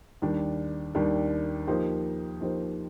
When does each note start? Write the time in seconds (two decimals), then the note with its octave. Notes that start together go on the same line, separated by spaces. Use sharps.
0.22 D#2 D#3 G3 D4
0.95 D#2 D#3 G3 D4
1.67 F3 A#3 D#4 G4 C5
2.41 F3 A#3 D#4 G4 C5